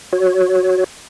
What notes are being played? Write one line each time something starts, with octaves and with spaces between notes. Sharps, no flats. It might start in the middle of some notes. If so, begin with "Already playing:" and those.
F#4 C#5